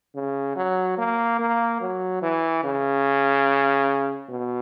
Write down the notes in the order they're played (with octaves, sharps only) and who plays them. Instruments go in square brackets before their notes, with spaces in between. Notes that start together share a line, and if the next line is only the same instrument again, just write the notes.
[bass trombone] C#3
F#3
A#3
A#3
F#3
E3
C#3
B2